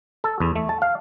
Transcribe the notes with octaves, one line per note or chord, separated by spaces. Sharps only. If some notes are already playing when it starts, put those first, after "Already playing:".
A4
E2
A3
A5
F5